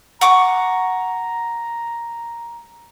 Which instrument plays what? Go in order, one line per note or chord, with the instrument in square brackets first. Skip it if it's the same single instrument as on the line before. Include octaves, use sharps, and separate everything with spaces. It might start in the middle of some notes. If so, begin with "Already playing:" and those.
[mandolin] F#5 C#6 D6 [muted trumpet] A#5